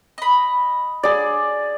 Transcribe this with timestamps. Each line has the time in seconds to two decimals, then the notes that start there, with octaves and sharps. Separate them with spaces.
0.18 D#5 B5
1.03 G#4 D5